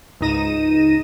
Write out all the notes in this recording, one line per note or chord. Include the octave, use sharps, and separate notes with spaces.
C#2 G#2 D#4 A#6 D#7 E7